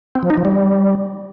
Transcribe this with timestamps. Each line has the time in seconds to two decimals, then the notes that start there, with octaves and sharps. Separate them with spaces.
0.15 C4
0.23 F3
0.30 D#4
0.37 F3
0.45 G3